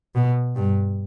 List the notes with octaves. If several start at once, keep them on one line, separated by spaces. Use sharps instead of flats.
B2
G2